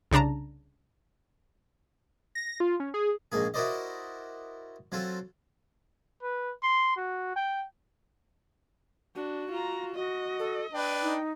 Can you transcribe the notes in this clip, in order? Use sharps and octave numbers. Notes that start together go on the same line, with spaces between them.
C2 C#3 D4 A5 A#5
A#6
F4
C#4
G#4
A#1 G#2 A#3 G#4
E4 F#4 A#4 C5 D5 D#5
F#3 C4 F4 A4
B4
C6
F#4
G5
D4 F#4
F4 A#5
F#4 D#5
A4
D4 B4 G5
D#4